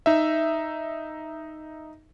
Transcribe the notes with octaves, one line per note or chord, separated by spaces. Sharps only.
D#4 E5